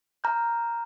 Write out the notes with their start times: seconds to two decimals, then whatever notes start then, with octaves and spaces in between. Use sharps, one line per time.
0.24 A#5 F6 G6